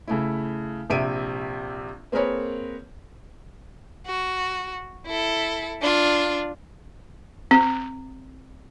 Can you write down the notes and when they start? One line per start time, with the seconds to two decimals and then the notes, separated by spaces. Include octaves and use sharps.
0.07 C#3 A3 E4
0.90 A#1 C3 E5 D7 D#7
2.12 A#3 C4 G#4 A#4 B4 C#5
4.06 F#4
5.07 E4 A4
5.82 D4 F4
7.51 C4